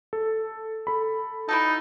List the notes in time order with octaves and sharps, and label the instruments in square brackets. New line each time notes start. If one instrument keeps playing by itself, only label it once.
[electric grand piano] A4
A4 B5
[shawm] D#4 [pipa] E4 F#4 A4